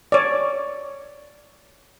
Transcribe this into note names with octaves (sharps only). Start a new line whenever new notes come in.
C#5 D5